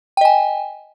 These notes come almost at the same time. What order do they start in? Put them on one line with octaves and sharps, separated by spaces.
G5 D#5 G#5